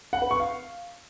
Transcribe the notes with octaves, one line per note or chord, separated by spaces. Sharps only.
F#5
B4
C#6
F5